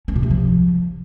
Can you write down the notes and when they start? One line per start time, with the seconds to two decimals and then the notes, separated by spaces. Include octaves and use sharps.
0.08 C#4
0.15 B2
0.23 C3
0.30 F3